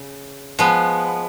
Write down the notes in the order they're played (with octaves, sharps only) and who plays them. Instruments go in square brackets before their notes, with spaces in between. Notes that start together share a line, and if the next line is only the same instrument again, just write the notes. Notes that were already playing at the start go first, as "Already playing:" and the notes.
Already playing: [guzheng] C#3
F3 G#3 B3